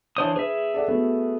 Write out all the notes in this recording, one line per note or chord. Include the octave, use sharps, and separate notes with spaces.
E3 D4 C5 C#5 A5 D#6
G#4 B4 E5
A4 D5 F#5
A3 B3 F#4